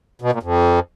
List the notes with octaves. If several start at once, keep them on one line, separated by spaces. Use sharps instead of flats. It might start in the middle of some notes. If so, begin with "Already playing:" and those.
B2
A#2
F2